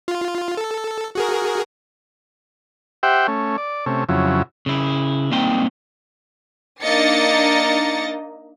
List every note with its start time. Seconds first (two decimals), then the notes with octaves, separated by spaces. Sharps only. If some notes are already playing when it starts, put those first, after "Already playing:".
0.08 F4
0.57 A4
1.15 F#4 G#4 A#4
3.03 G4 C5 E5 F#5 G5
3.28 A3 C#4
3.58 D5
3.86 C3 A3 C#4
4.09 F2 C#3 F#3 E4
4.66 C#3 E4
5.32 G3 A#3 C4 D#4 G5
6.82 A#3 D4 D#4 D#5 A6 C#7